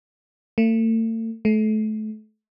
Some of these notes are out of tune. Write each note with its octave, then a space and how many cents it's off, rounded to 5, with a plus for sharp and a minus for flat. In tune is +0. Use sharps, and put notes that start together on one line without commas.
A3 +40
A3 -30